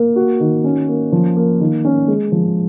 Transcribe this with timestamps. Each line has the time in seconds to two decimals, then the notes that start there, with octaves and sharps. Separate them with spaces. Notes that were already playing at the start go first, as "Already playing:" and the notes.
Already playing: A#3
0.16 F#4
0.40 D#3
0.64 C#4
0.88 A#3
1.12 F3
1.37 A#3
1.60 D#3
1.85 C#4
2.08 G#3
2.32 F3